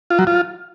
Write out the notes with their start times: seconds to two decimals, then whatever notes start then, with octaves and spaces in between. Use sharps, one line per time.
0.10 F4
0.19 F#3
0.27 F4